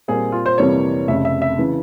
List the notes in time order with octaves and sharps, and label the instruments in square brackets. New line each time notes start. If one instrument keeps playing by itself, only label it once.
[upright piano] A#2 G3 C4 [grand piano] G#4
[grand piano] F4
C5
[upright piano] F2 C3 E3 G3 A#3 [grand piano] C#5
[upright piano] F1 F2 C#3 [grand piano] E5
[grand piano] E5
E5
[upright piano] C#3 E3